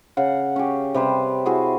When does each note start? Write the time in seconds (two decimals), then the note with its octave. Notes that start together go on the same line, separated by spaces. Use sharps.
0.17 C#3 F5 F#5
0.56 C#4 G4
0.94 C3 G3 B4 C5
1.46 E4 F#4 G#4